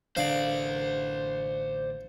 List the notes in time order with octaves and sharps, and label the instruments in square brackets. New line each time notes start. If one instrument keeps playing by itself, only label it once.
[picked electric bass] A1 D3 D4 [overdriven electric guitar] C5 D5 [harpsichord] F5